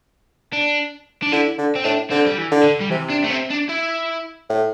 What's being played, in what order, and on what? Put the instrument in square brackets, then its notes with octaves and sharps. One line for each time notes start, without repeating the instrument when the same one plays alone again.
[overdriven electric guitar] D4
D4
[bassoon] D3 [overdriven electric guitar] E4
[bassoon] D3
[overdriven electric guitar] C4
[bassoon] A2 [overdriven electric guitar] D4
[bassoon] D3 [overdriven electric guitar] C4
[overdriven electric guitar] G3
E3
[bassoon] D3
[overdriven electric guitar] D3
G3
[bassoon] C3 [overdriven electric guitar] E3
[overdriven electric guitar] D4
A3
C4
D4
E4
[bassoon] A2